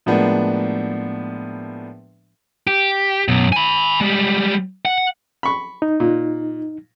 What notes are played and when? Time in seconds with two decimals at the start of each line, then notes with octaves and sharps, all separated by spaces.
0.06 A2 F3 G#3 A#3 B3 D4
2.67 G4
3.28 F#2 B2
3.53 G#5 B5
4.01 G3 G#3
4.85 F#5
5.43 B5 C#6
5.82 D#4
6.00 A#2